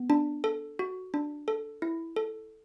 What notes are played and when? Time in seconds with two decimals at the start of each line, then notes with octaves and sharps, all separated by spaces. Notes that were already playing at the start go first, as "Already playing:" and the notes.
Already playing: B3
0.10 D4
0.44 A4
0.79 F#4
1.14 D4
1.48 A4
1.82 E4
2.16 A4